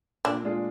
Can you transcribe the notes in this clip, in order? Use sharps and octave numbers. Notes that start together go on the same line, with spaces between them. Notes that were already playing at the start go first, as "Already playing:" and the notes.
A#2 D4
G#3 D4 F4 G#4